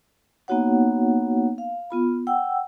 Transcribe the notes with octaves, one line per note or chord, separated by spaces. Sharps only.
A#3 B3 D#4 F#4 C#5 F#5
F5
B3 F4 B5
F#5 G5 E6